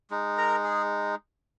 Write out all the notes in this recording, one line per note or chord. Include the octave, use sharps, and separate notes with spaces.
G#3 D#4
A#4 A#5
G#4